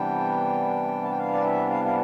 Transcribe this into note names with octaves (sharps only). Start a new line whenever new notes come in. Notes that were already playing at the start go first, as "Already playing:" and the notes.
Already playing: C3 E3 G3 B3 D4 G5
A5
G5
F5
D5
E5
F5
F5